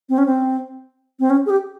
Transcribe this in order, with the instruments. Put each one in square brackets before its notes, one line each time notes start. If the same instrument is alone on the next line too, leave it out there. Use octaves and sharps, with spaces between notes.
[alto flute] C4
C#4
C4
C4
C#4
G#4
G4